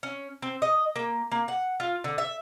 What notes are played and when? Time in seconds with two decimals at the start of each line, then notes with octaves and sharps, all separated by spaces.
0.03 C#4
0.42 C4
0.62 D#5
0.96 A#3
1.32 A#3
1.48 F#5
1.80 F4
2.04 D3
2.18 E5